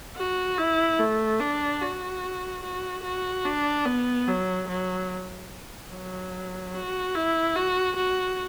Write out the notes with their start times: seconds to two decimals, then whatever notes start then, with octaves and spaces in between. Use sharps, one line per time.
0.16 F#4
0.58 E4
1.00 A3
1.41 D4
1.81 F#4
2.63 F#4
3.04 F#4
3.45 D4
3.86 B3
4.28 F#3
4.68 F#3
5.92 F#3
6.74 F#4
7.15 E4
7.56 F#4
7.96 F#4